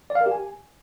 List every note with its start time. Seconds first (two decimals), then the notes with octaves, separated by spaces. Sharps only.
0.10 D5
0.15 F5
0.21 A#4
0.26 G4
0.31 G#5